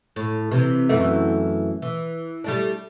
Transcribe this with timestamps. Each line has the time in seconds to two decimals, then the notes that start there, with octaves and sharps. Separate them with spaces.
0.16 A2
0.51 C3 E3
0.89 F#2 E3 A3
1.82 E3
2.44 G3 A3 D4